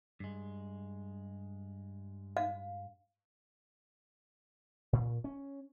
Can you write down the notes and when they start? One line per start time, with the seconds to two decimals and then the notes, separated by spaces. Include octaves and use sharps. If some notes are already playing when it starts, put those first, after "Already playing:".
0.20 G2 G#3
2.37 F5
4.93 A#2
5.24 C#4